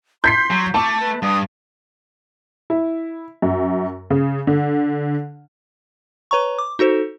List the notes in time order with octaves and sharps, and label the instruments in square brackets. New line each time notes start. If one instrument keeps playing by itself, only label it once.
[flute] C6 [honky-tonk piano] G6 B6 C7
[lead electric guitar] F#3
[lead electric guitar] A3 [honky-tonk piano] A5 [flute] D6
[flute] B4
[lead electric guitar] G2 [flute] D#6
[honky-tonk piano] E4
F#2
C#3
D3
[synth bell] B4 C#5 A#5 C#6
D6
D#4 F#4 A4 C5